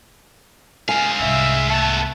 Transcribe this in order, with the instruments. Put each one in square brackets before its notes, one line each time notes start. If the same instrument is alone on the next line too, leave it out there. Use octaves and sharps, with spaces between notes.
[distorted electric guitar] G#3 F5 [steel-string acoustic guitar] G#5
[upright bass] C2 G#2 [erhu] E5
[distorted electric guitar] A3 B3 [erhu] A5